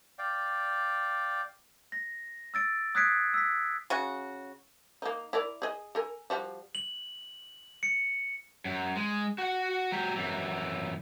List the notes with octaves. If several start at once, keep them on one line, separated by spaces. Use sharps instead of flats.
D5 F5 G5
A#6
E6 A6 D7
D#6 F#6 G#6 B6 C7 D7
E6 B6
C#3 F#4
A#3 D#4
E4 A#4 D5
G#4 D#5
A4 A#4 G#5
F3 G3 F#4
F#7
C#7
F#2
G#3
F#4 F#5
F#3 G4
F#2 E3